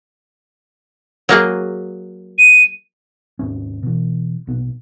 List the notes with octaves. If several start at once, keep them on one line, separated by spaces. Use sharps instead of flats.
F#3 A#3 G#4
D#7
G#1 D#2 C#4
B2 E3
A#1 B2 B3